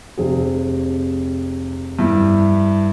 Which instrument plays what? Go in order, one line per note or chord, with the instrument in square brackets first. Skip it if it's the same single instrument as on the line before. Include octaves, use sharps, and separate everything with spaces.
[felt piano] F1 C3 G#4
[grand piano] G2 E4